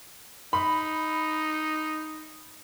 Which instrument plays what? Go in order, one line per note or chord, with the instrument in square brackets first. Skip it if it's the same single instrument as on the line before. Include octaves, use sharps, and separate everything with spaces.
[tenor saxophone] D#4 [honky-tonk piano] B5